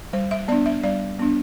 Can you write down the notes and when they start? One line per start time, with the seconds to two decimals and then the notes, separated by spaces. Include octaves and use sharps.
0.13 G3 C5
0.31 E5
0.48 B3 D5
0.52 D4
0.66 E5
0.84 G3 D5
1.19 B3 D4